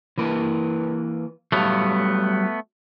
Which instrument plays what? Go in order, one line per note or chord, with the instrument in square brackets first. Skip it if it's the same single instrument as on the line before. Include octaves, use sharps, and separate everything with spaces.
[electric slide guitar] E3 A#3 B4
[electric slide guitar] F#3 G3 F5 [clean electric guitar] A3 B3